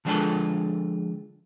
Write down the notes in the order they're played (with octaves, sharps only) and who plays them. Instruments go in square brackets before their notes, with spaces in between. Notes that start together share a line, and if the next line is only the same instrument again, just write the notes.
[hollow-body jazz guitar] D3 F3 G#3 D4 F4 A4